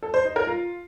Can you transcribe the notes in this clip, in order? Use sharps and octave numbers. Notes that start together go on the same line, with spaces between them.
A4
C5
D#4
A#4
F4